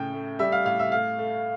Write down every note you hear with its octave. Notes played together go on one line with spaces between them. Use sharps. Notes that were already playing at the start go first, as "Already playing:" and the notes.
Already playing: A2 C#3 G5
A3
G3 E5
F5
A2 F5
E5
A3 F5
A3